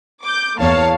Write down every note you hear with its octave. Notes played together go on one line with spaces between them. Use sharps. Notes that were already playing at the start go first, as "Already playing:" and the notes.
D6 G6
E2 A#3 C#5 F5 A5